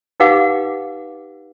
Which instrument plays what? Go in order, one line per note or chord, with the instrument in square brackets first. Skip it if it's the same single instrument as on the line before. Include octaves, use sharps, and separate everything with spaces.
[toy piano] D#4 G4 B4 F5 F#5 D6